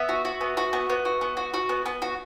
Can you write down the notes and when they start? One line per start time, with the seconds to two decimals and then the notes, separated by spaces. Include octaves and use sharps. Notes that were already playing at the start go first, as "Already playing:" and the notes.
Already playing: B3 E5
0.09 F#4
0.25 F#4
0.41 B3
0.57 F#4
0.73 B3
0.90 B3
1.05 F#4
1.21 B3
1.37 F#4
1.54 F#4
1.69 B3
1.86 B3
2.02 F#4